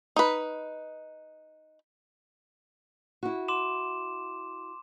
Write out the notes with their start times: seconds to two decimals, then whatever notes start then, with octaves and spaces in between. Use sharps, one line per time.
0.16 D#4 B4
3.23 E4 F#4
3.48 C6 D6 E7